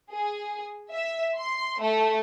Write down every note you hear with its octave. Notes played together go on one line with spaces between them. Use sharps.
G#4
E5
C6
A3